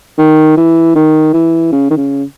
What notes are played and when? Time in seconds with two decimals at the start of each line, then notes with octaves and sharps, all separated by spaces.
0.18 D#3
0.57 E3
0.95 D#3
1.33 E3
1.72 C#3
1.90 D#3
1.97 C#3